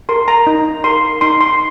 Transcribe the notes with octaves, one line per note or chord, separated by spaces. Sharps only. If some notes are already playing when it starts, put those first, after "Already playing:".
A#4 C6
A#5
D#4
A#4 C6
D#4 C6
C6